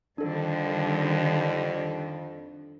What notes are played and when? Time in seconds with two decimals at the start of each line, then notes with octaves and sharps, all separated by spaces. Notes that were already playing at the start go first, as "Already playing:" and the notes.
0.18 F2 D3 D#3 G3 D4 A4